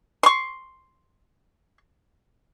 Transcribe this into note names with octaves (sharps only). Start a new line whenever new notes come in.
C6 C#6